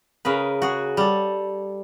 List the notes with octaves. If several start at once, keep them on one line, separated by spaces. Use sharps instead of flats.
C#3 G#4 A#4 B4
F#4 G#4
G3 A4